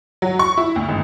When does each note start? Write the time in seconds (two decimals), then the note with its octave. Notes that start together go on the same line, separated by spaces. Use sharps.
0.22 F#3
0.39 C#6
0.57 E4
0.76 D2
0.89 G#1